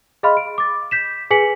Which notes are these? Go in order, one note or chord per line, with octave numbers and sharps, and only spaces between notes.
G#4 D#5 F5 B5 C6 F6
D7
D6 A6
G6 B6 E7
G#4 B4 G#5 B6 C#7 F#7